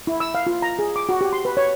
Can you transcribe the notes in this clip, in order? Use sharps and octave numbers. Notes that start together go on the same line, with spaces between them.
E4
E6
F5
F4
A#5
G#4
D6
F#4
G4
C6
B4
C#5